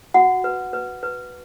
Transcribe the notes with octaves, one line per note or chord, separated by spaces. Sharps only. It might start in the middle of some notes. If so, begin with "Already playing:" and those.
F#4 F#5
B4
B4
B4